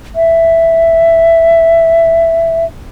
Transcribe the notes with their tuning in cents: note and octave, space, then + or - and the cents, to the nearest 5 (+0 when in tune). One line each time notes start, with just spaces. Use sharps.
E5 +5